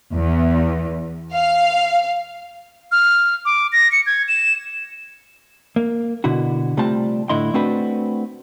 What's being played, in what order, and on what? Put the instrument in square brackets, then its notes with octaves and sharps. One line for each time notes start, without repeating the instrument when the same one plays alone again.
[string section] E2
F5
[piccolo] F6
D6
A#6
C#7
G#6
E7
[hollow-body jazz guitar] A#3
B2 D3 E4 F#4
C3 G3 A3 C4 F4 A5
A2 D3 E4 D#5 C6
A3 C4 D4 F#4 B4